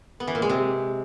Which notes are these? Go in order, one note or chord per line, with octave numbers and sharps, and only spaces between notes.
B3
E3
A#2
G#3
C3